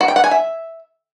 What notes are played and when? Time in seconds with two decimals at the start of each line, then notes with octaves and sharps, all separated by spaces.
0.01 F#4
0.08 G5
0.16 F#5
0.24 G#5
0.31 E5